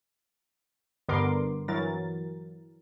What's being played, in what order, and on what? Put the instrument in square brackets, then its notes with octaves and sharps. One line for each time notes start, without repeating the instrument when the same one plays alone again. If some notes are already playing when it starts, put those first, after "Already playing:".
[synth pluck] G2 D3 B3 A#4 C6 D6
E3 F#3 A#4 A6